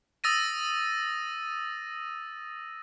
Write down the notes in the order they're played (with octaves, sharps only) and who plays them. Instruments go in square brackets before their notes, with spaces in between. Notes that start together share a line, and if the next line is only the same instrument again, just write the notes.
[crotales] D#6 E6 A6 A#6 D#7